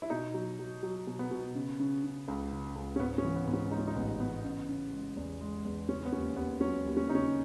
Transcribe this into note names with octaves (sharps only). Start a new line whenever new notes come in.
E4
B2 D#4
F#3
F#3
F#3
B2
B3
B2
C#3
C#3
C#3
C#2
C#3
C#2
C#4
G#2 B3
C#4
E3
B3
G#2 B3
C#4
G#3 D#4
C#4
D#4
A1 B3
E3 B3
C#3
C#3
G#3
E2
G#3
E2
C#3 C#4
B3
D#2 C#4
D#2 B3
F#3 C#4
D#2
C#4
C#3 D#4
C#4